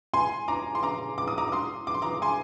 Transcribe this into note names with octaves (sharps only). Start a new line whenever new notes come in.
G#5 C6
A#5 D6
C6
A#5 D6
D6
D#6
A#5 D6
D6
C6 D#6
D6
C6
A#5 D6
G#5 C6